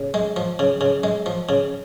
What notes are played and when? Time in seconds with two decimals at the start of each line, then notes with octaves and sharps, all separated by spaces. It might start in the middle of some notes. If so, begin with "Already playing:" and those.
Already playing: C#3
0.14 G#3
0.36 F3
0.59 C#3
0.81 C#3
1.04 G#3
1.26 F3
1.49 C#3